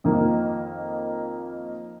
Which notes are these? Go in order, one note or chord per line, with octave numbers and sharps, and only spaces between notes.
F2 D#3 A#3 D#4